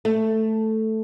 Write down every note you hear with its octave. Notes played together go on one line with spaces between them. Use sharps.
A3